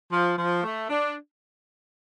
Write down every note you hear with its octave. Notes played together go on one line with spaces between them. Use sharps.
F3
F3
A3
D4